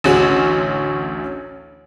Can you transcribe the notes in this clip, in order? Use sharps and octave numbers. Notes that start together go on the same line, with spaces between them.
A1 D2 C#4 F#4 C#5